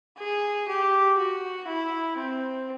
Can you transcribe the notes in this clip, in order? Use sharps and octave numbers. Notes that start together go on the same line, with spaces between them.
G#4
G4
F#4
E4
C4